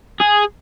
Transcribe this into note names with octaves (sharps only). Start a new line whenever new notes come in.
G#4